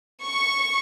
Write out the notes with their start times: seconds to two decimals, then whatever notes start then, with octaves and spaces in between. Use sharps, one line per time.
0.26 C#6